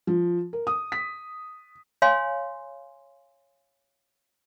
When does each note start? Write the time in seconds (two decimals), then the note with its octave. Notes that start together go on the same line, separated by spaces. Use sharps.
0.07 F3
0.53 A#4
0.67 D#6
0.92 B6
2.02 C#5 F5 G#5 C6